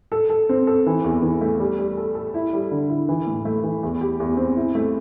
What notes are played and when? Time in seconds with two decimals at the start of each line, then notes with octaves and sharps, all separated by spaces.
0.12 A4
0.30 A4
0.49 C4
0.67 A4
0.86 E3
1.04 E2
1.22 E3
1.41 A3
1.60 G3
1.79 G3
1.97 A4
2.15 A4
2.34 E4
2.53 G3
2.71 D3
2.89 E4
3.09 E3
3.27 A2
3.45 A3
3.64 E3
3.83 E2
4.01 G4
4.20 E2
4.37 C4
4.56 E4
4.75 A3